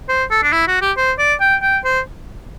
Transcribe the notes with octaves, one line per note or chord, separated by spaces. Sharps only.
C5
A4
D4
E4
F#4
G4
C5
D5
G5
G5
C5